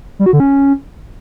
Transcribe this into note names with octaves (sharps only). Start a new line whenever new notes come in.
G3
F#4
D3
C#4